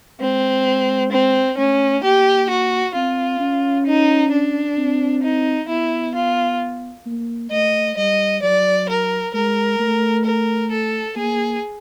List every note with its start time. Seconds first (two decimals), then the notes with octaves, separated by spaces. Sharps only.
0.20 G#3 C4
1.12 C4
1.58 A3 C#4
2.03 A#3 G4
2.50 F#4
2.95 C4 F4
3.40 C#4
3.86 D#4
4.32 D4
4.78 C4
5.23 D#4
5.68 B3 E4
6.15 F4
7.06 A#3
7.51 A3 D#5
7.97 G3 D#5
8.43 F#3 D5
8.89 A#4
9.34 G#3 A#4
9.80 A3
10.25 A#4
10.71 A4
11.16 A#3 G#4